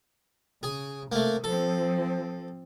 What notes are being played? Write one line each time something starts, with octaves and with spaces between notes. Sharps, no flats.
C#3 G#4
C3 A3 A#3
F3 C4 A4